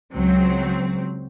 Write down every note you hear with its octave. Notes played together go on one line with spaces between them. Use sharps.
C#2 F#3 C4